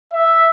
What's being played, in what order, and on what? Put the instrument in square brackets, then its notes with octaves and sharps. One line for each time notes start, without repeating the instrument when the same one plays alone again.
[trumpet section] E5